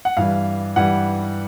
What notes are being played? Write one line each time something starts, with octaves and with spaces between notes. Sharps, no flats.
F#5
G2 E3 G3 F5
G2 E3 G3 F#5